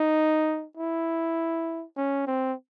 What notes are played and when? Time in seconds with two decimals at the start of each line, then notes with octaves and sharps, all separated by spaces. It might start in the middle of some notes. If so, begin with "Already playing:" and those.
Already playing: D#4
0.77 E4
1.97 C#4
2.27 C4